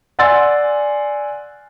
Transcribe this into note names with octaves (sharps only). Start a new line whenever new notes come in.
D5 F#5 G#5 C6 E6 A6